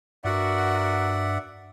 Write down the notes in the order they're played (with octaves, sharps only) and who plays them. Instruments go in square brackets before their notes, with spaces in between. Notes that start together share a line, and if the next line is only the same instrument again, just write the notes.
[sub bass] G2 [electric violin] F#4 A#4 [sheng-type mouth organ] D5 E5 F#5